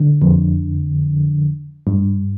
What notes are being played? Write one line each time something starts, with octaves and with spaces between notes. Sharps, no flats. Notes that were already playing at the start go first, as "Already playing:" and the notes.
Already playing: D3
F2
G2